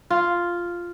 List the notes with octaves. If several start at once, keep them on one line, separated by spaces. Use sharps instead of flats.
F4